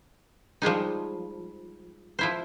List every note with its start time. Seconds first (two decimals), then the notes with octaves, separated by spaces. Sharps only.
0.62 F3 G3 G#3 D#4
2.19 F3 E4 C5